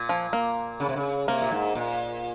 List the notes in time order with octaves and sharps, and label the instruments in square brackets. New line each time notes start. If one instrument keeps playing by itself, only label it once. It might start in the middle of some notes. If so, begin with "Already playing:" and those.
Already playing: [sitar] A#2
[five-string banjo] F3
A#3
[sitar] C#3
C3
C#3
[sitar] C3 [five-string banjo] A#3
[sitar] A#2
G#2
A#2